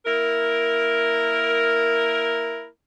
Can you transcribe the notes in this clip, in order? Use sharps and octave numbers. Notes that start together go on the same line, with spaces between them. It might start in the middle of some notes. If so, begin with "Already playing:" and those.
A#3 E4 A#4